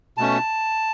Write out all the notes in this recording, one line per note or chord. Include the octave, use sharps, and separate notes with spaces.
B2 A3 C#4 A5